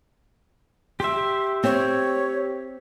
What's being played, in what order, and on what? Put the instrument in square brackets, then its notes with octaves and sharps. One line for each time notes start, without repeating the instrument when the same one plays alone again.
[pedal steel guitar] G4 E5 [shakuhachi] C6
[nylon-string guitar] C4 [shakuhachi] C#5